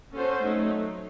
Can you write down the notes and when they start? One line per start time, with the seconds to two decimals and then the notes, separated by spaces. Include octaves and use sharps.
0.12 C#4 F#4 A4 C5
0.40 F#3 A3 D#4